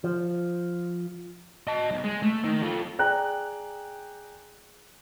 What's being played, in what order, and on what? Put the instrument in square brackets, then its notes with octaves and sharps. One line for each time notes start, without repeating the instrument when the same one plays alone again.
[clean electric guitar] F3
[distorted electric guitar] D#5 A5
B1
G#3
A3
D#3
F4 A4
[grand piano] G#4 D5 G5 A#5 F#6